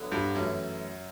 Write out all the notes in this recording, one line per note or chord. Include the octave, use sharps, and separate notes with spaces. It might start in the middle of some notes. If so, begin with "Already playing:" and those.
Already playing: D3 F#3 B3 E4
G2
F#2 E3 A3 C#4 E4